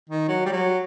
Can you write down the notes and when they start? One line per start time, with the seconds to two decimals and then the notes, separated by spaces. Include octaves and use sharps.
0.10 D#3
0.28 F#3
0.46 G3
0.52 F#3